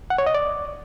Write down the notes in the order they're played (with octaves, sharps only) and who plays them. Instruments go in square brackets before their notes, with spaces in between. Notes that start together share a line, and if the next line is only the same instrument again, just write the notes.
[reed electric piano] F#5
C#5
D#5
D5